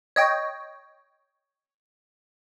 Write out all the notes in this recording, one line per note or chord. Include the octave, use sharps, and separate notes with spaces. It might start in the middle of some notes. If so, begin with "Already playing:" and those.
C#5 D#5 G5